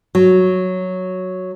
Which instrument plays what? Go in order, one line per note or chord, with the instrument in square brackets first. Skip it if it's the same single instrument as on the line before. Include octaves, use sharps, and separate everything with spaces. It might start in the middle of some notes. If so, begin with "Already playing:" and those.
[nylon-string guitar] F#3